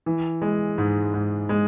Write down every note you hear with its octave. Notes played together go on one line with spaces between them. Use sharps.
E3
G#3
G#2
G#2
G#3